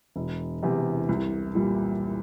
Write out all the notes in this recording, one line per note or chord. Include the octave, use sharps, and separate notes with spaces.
E1
E2 C3
C2
A#2 G3